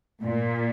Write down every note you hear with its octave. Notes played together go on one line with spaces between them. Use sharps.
A#2